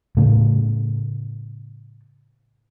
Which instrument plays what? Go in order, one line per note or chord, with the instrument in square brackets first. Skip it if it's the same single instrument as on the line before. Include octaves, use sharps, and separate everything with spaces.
[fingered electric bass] A2 C#3 A3